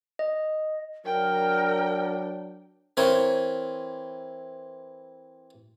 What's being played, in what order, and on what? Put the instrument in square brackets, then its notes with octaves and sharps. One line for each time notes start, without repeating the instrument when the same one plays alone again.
[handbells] D#5
[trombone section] F#3 D4 [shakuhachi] A#4 [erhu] G5
[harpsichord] E3 C4 A#4 C#5